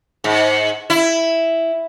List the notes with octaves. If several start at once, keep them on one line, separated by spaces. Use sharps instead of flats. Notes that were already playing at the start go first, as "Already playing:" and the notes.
G#2
E4